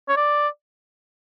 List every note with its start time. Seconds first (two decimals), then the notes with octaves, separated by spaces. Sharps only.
0.09 C#5
0.17 D5